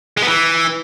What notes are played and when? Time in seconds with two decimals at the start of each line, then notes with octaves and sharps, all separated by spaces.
0.17 G#3
0.22 B3
0.27 E3